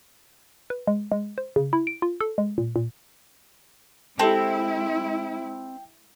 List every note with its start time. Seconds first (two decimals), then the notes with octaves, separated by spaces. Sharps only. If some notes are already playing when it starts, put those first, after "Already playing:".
0.70 B4
0.87 G#3
1.12 G#3
1.38 C5
1.56 C#3
1.73 E4
1.87 D7
2.02 F4
2.21 A4
2.38 G#3
2.58 A#2
2.76 A#2
4.19 G#3 C4 E4 G4 A4 G5 A5